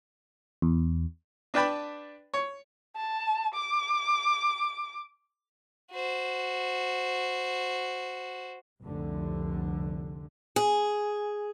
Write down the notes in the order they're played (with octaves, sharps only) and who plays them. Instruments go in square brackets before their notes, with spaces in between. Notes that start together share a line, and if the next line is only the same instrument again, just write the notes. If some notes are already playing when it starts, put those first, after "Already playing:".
[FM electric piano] E2
[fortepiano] D4 B4 D5 G5 A5 B5
C#5
[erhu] A5
D6
[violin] F#4 C5
[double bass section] F1 C2 D3
[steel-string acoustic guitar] G#4